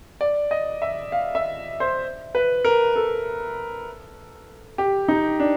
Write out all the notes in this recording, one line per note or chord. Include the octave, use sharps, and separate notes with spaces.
D5
D#5
E5
F5
E5
C5
B4
A#4
A4
G4
D#4
D4